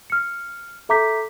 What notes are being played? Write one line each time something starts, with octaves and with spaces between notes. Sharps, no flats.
F6 C#7
A4 E5 A#5 D6 G6 B6